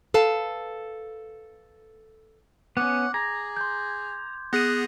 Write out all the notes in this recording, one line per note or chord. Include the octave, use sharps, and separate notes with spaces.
A4 B4 F5 A5
B3 C#4 F#5 D6
G#4 A#5 G#6
C6 G6
B3 G#4 F#5 A#6 D#7